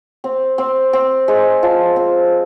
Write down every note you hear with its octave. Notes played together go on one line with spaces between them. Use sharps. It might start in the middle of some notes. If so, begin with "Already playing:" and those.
C4
C4
C4
G#3
F3
C4